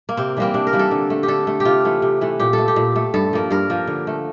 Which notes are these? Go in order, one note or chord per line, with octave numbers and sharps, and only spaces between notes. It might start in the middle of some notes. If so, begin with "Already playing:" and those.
A#3
C3 C4
E3 G3 A#3 C4
C3 D4
A#4
E3 G3 A#3
A4
D3
A3
G4
D3 A4
A3
G4
C3 F4
E3 A3
C3
E3 A3
A#2 G4
A4
A3
G4
A#2
A3
G2 A4
F3 A#3
G2 A#4
F3 A#3
D3
A3